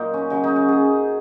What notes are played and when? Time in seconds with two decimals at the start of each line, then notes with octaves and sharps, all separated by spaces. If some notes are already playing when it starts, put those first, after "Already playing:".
Already playing: A#2 F#3 A#3 D#4
0.14 C#4
0.30 C#3 F#3 C#4 D#4
0.44 D#4
0.56 F#4
0.69 G#4